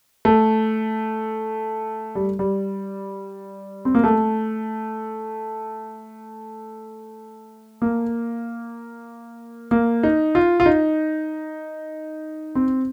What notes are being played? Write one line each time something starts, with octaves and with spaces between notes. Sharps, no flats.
A3
G3
G3
C4
A#3
A3
A#3
A#3
D#4
F4
F4
D#4
C4